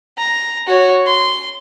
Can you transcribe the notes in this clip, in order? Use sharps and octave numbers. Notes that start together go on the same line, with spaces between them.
A#5
F#4 C#5
C6